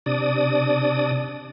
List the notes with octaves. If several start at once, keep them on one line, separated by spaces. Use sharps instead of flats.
C3 D4 D5 D#6